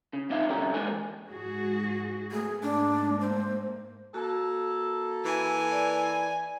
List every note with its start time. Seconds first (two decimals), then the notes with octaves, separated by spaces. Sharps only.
0.13 C#3
0.30 E2 C4 D#4 E5 F5
0.48 C2 D3 C#4 G4 A#4
0.74 A#2 D3 E3 G#3 A#4 G#5
1.29 G#2 F#4 G#4
2.31 A3 B3 G#4
2.63 G#2 A3 A#3 D4
3.20 C5
4.14 A#3 F#4 A4
5.25 E3 G#5
5.72 D5